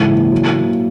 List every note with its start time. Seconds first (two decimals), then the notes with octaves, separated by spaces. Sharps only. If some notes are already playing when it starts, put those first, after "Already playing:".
Already playing: G#2 C#3 E3 E4
0.08 A#2
0.32 F#3
0.56 A#3